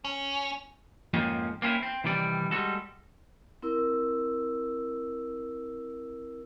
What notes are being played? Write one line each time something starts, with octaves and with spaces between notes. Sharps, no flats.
C#4
F2 G#2 F3 A#3 C4 C#4
A#3 C4 C#4 E4
C4
C3 D#3 E3 G3 D5
G3 G#3 F#4 A4
C4 E4 A#4 E6